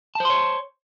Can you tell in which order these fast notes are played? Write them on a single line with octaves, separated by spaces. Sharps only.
A5 C5 C6 C#5